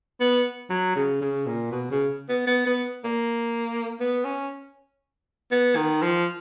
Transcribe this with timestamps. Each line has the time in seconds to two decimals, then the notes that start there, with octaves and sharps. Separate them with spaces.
0.20 B3
0.70 F#3
0.96 C#3
1.21 C#3
1.46 A#2
1.71 B2
1.91 C#3
2.29 B3
2.47 B3
2.66 B3
3.04 A#3
4.00 B3
4.25 C#4
5.51 B3
5.76 D#3
6.02 F3